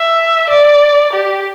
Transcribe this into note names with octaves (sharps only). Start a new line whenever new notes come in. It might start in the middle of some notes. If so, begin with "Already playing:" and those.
Already playing: E5
D5
G4